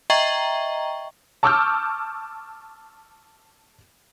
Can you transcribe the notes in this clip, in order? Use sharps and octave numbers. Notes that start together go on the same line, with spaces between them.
D#5 E5 G5 A#5 C#6
A5 C#6 D6 E6 F6 G6